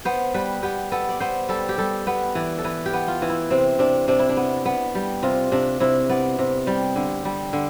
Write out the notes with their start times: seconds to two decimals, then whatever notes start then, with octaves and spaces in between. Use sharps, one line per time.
0.05 B3 C5
0.34 G3 B4
0.63 B3 G4
0.92 B3 A4
1.09 D5
1.20 B3 C5
1.49 G3 A4
1.69 G4
1.78 G3 A4
2.07 B3 B4
2.35 E3 D5
2.58 A4
2.64 E3 B4
2.86 G4
2.93 B3
3.08 F4
3.22 E3
3.29 E4
3.50 C3 C4
3.79 C3 D4
4.08 C3 D4
4.19 E4
4.29 D4
4.37 B3
4.65 B3
4.95 G3
5.23 C3 F4
5.52 C3 D4
5.80 C3 E4
6.09 B3 D5
6.39 C3
6.67 G3
6.96 D3
7.25 G3
7.53 D3